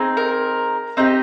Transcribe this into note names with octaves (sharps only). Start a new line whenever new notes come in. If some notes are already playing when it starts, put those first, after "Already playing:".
Already playing: C4 D#4 G#4
A#4
C4 D#4 G4